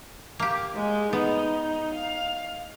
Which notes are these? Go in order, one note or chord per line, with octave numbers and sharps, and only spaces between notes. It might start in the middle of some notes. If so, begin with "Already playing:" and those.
A#3 G4
G#3
B3 D#4
F5